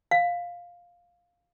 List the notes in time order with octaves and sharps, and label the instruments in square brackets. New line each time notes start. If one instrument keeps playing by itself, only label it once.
[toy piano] F5